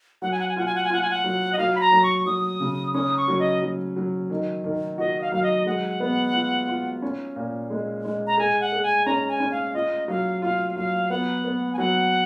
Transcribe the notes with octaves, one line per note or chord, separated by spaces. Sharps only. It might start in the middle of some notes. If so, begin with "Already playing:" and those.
F#3 F#5
G#5
F#5
G#5
F4 F#5
G#5
F#5
G#5
F4 F#5
G#5
F#5
F#3
D#5
F#3 F5
B5
A#5
F#3
C#6
F#3 D#6
C#3
C#4 D#6
C#6
F#3
D#5
F#3
F#3
D#3
D#3
F#4 D#5
F5
F#3 F5
D#5
G#3 F#5
B3
F4
F4
C#4
A#2
G#3
G#3
A#5
G#4 G#5
F#5
G#4
G#5
C#4 A#5
G#5
C#4
F5
F4 D#5
F#3 F5
F4 F5
F#3 F5
B3 F#5
B3
G#5
F#3 F#5